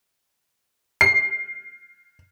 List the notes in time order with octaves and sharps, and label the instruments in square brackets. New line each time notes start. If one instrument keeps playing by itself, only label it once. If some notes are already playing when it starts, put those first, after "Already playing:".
[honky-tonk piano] C7